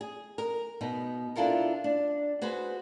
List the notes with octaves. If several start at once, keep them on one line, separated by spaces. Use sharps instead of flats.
G#4
A#4
B2 B3 D#4
D4 E4 F4 A4 A#4
D4
F#4 G#4 B4 C5